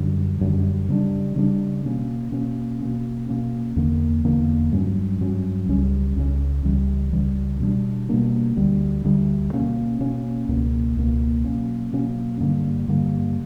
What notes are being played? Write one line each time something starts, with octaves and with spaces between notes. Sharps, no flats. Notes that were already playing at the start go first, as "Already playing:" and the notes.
Already playing: F#2 D3 G3
F#2 D3 G3
C#3 G3 A#3 D4
C#3 G3 A#3 D4
B2 A#3 C#4
B2 A#3 C#4
B2 A#3 C#4
B2 A#3 C#4
E2 D3 A#3
E2 D3 A#3
G2 F#3 C#4
G2 F#3 C#4
C#2 C#3 G3 C#4
C#2 C#3 G3 C#4
C#2 C#3 E3 G3
C#2 C#3 E3 G3
B2 G3 A#3 D4
B2 G3 A#3 D4
D2 D3 G3
D2 D3 G3
B2 A#3 C#4
B2 A#3 C#4
C#2 B2 A#3
C#2 B2 A#3
B2 F#3 A#3 C#4
B2 F#3 A#3 C#4
G2 D3 A#3
G2 D3 A#3